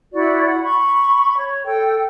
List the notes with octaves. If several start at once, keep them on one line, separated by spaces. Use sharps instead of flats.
E4 F#4 D5
F#5 B5
B5 C#6
C#5
A4 G5